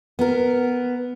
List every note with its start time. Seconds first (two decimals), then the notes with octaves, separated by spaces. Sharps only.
0.19 B3 A#4